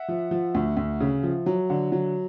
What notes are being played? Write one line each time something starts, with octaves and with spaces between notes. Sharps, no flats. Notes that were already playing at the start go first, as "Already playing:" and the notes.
Already playing: E5 F#5
F3
F3
D2
D2
C#3
F3
F#3
D3
F#3